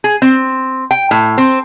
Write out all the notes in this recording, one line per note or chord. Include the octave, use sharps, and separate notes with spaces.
G#4
C4
G5
A2
C4